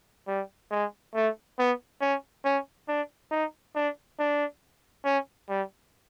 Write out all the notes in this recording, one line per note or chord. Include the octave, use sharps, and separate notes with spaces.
G3
G#3
A3
B3
C#4
C#4
D4
D#4
D4
D4
C#4
G3